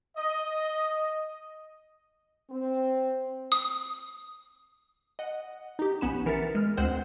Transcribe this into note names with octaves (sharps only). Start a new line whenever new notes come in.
D#5
C4
D#6
D#5 F#5
D#4 G4
A#1 B3 C#4 B5 E7
E3 A#4 A6 B6 C#7
G#3 F6
D2 G#3 C4 C5 F#5